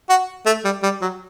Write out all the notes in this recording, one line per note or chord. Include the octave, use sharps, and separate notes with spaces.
F#4
A3
G3
G3
F#3